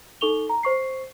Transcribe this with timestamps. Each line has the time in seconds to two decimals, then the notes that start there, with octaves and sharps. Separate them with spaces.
0.21 D#4 A4 C#6 F7 G7
0.50 A#5
0.63 C5 C#6 C7